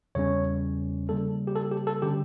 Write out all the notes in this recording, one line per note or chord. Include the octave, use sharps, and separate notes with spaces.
E2 C#3 G3 C#4 C#5
C#3 G3 A#3 A4
G4
A4
G4
A4
D3 G3 C#4 G4